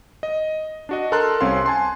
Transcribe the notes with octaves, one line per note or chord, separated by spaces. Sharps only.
D#5
D4 F#4 D#5
A4 A#4 A5 A#5 C6 F#6
C2 C4 C#4 F5 C6
G#5 A5 C6